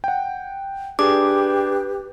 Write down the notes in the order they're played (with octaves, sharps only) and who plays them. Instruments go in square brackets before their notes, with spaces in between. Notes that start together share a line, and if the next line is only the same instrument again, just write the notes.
[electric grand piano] F#5 G5
[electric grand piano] D4 G#4 [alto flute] G4 [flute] B4 [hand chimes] D6